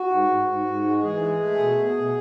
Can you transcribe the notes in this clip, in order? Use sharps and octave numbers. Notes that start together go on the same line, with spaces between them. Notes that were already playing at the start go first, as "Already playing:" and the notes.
Already playing: F#4
G#2
G#2
G#2
G#2
G#3
E3 G#4
G#3
A3
B2
B2
B2